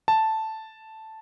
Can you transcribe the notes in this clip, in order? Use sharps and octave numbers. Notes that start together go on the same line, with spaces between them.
A5